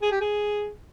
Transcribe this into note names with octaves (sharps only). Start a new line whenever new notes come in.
G#4
G4
G#4